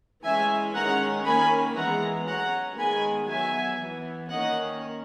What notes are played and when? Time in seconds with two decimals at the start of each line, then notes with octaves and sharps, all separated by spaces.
0.25 E3 G#3 C#4 E5 G#5
0.75 D#3 G#3 C#4 F#5 A#5
1.26 D#3 A#3 C#4 G#5 B5
1.77 E3 G#3 B3 F#5 A#5
2.27 F#3 C#4 F#5 A#5
2.78 D#3 G#3 B3 G#5 B5
3.29 F#3 B3 E5 G#5
3.79 E3 B3
4.30 D#3 A#3 C#4 D#5 F#5